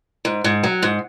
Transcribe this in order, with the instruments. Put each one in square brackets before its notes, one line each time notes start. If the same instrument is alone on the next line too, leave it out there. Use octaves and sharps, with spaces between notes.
[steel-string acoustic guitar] G#2
G#2
F#3
G#2